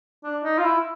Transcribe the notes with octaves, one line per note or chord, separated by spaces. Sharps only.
D4
D#4
F4
E4